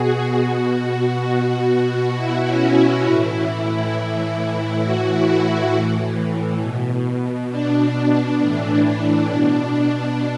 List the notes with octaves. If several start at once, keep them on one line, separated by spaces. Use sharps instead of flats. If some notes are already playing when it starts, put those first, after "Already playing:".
Already playing: B2 F#4 G#4
B2
B2
B2 E4
C#4
C#4
A2 E3 E4
A2 E3
A2 E3 F#4
E4
E4
A2 E3
B2
B2 D4
A2 E3 D4
B2